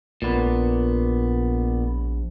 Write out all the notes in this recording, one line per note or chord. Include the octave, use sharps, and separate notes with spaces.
A#1 A#2 B3